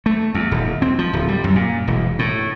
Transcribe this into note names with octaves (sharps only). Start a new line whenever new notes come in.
A3
E2
D#1
C4
F3
D1
G3
F#2
A#2
E1
A2